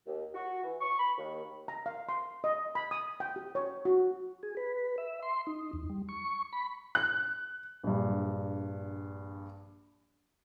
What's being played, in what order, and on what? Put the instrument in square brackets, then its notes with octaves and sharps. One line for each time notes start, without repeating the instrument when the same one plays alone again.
[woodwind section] D#2
F#4
E3
C#6
B5
D#2
[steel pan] A#5
F5
C6
D#5
B5
D#6
G5
G4
C#5
F#4
[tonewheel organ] G#4
B4
E5
C6
D#4
E2
G3
C#6
B5
[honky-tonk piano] F#6
[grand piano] A#1 G2